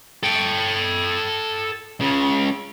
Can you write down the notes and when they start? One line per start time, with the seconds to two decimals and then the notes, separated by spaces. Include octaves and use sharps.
0.23 A4 G5
2.00 C#2 C#3